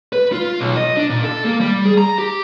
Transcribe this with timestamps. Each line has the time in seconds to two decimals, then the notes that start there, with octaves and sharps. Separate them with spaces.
0.13 B4
0.33 F4
0.60 B1
0.76 D#5
0.97 D4
1.10 A#2
1.24 A4
1.45 A#3
1.60 G3
1.85 G#4
1.98 A#5
2.18 G4